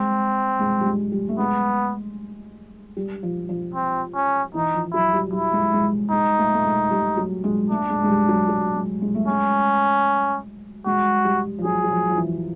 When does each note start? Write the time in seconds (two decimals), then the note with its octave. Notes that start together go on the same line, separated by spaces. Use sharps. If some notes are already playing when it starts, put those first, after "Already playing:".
Already playing: G#3 C4
0.59 G#3
0.81 G3
0.86 G#3
1.12 G3
1.29 A3
1.38 G#3 B3
2.97 G3
3.23 F3
3.49 F3
3.75 C4
4.15 C#4
4.54 E3 D#4
4.74 F3
4.93 F#3 E4
5.13 G3
5.33 G3 E4
5.53 G#3
5.73 G#3
6.11 G#3 D#4
6.38 A3
6.54 A3
6.64 G#3
6.91 G3
7.17 F#3
7.44 G#3
7.70 A3 D4
7.89 G#3
8.03 G#3
8.09 G3
8.29 F#3
8.49 F#3
8.75 G#3
9.01 G#3
9.15 A3
9.28 G#3 C#4
10.85 G#3 F#4
11.25 G3
11.58 F3
11.64 F#3 G#4
11.84 F#3
11.90 F3
12.10 F3
12.17 E3